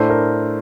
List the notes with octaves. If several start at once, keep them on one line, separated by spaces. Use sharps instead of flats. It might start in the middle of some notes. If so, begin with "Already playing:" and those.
Already playing: A2 A3 D4 C5
A#4